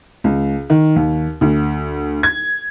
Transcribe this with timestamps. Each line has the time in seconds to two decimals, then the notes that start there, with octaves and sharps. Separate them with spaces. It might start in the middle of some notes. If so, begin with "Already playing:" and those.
0.24 C#2
0.70 D#3
0.96 D#2
1.41 D2
2.23 G#6